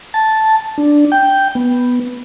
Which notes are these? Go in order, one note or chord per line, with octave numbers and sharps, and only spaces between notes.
A5
D4
G5
B3